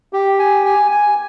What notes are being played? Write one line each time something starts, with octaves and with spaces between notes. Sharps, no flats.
G4
G#5
G#5
G#5